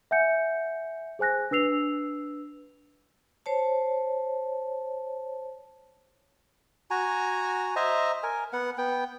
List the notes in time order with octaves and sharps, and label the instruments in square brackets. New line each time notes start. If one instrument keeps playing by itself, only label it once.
[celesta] E5 F#5 G#5 G6 C#7
G#4 C5 G#5 F#6 A#6
D4 B4 E6 C7 F7
[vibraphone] C5 C#5 A5
[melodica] F#4 G#5 A#5
C5 D#5 E5 A#5
A#4 G#5
B3 F#5
B3 G5